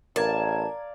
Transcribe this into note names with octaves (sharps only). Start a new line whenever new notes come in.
A1 A#4 D5 F5 A5 A#5 G#6